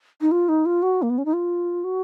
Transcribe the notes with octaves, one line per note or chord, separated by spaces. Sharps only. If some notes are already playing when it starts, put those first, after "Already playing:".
D#4
F4
D#4
F4
F#4
A#3
B3
C#4
D#4
F4
F#4